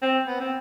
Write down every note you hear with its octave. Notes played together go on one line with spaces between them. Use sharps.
C4
B3
C4